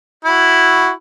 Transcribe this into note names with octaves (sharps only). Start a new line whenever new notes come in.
E4 F#4